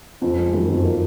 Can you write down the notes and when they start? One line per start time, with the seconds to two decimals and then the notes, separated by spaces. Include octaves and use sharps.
0.22 F2 C#4
0.38 G#3
0.53 F#2 D#3
0.68 F2 D#3
0.84 A#3